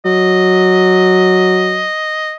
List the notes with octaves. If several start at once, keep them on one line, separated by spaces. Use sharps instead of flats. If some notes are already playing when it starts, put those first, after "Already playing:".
F#3 D#5